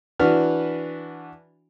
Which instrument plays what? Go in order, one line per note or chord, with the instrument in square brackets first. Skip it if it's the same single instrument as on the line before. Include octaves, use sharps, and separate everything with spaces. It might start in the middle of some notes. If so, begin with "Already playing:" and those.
[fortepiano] E3 D4 F#4 B4 F6